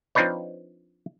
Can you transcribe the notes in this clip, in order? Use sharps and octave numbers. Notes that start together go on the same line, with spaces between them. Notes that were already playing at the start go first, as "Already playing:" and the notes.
F3 C4 D4 D#4 B4 C#5